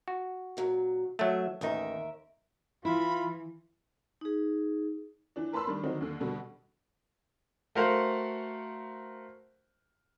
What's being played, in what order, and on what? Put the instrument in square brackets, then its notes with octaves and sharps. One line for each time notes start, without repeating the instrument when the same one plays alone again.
[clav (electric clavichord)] F#4
[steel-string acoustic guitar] A#2 F#3
[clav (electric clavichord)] F#3 A3 [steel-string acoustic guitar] E5
[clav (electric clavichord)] A1 D#4 [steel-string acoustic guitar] D#2 A#4 E5
[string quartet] E3 [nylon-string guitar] E4 [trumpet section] F4 [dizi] B5
[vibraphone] D#4 G#4
[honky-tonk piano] E3 D4
A#4 B4 A5 B5 C6 E6
D#3 G3 D4
D3 D#3 F#3 C4 D4 D#4
D#2 D3
B2 D3 G3
[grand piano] A3 F#4 A#4 C5 F5 F#5